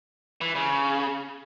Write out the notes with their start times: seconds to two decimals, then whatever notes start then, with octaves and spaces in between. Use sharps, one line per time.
0.41 E3
0.55 C#3